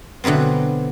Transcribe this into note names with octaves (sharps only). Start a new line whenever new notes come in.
B2 D3 F#3 B3 C4